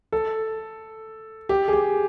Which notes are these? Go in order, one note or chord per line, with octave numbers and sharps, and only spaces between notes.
A4
G4
G#4
G4